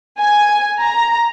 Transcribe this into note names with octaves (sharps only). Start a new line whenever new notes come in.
G#5
A#5